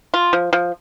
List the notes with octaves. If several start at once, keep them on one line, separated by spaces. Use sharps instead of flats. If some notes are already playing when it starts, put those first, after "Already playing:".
F4
F3
F3